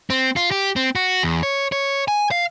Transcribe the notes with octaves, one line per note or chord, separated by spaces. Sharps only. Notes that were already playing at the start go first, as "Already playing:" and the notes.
C4
F4
G4
C4
F#4
E2
C#5
C#5
G#5
F5